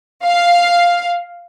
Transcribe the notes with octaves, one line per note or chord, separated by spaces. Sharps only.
F5